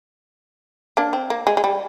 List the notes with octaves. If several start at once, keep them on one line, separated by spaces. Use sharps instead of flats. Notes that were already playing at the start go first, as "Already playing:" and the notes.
A#3 D4
C4
A#3
G#3
G#3
G3